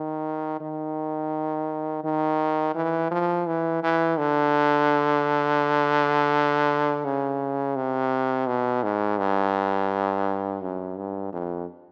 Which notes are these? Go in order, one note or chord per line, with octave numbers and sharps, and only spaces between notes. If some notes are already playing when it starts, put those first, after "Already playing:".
Already playing: D#3
D#3
D#3
E3
F3
E3
E3
D3
C#3
C3
B2
G#2
G2
F#2
G2
F2